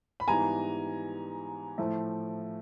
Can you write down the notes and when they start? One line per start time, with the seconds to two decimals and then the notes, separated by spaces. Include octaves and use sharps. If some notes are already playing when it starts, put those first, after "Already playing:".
0.20 B5
0.28 G#2 E3 G3 B3 G#5 A#5
1.78 A2 F3 A3